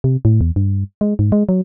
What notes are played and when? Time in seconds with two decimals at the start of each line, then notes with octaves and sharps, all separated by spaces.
0.04 C3
0.25 A2
0.41 E2
0.56 G2
1.01 G#3
1.19 G#2
1.32 G#3
1.49 F#3